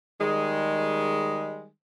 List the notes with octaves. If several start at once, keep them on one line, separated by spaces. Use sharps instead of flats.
D#3 G3 G#3